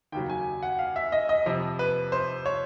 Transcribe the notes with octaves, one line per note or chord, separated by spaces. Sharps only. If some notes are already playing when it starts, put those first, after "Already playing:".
D#2 C#3 F#3 G5
G#5
F#5
F5
E5
D#5
D#5
F2 C3 F3
B4
C5
C#5